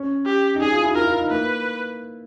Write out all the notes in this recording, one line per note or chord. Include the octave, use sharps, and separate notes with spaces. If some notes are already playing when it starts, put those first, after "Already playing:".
Already playing: C#4
G4
D#4
D4 G#4
F4
E4
F4
E4 A#4
F4
D#4
A#3 B4